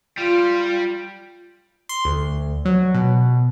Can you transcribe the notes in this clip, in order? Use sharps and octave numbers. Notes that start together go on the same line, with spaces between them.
G3 F4
C6
D2
F#3
B2